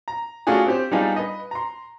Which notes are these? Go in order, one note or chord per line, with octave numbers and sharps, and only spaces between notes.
A#5
A3 C#4 D4 F4 F#4 G#4
C4 G4 C5
G3 B3 D4 D#4 F4 G#4
B4 D#5
A#5 C6